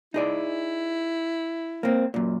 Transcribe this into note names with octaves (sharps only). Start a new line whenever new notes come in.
D#4 E4 G#4 D5
A#3 C4
F#2 A#2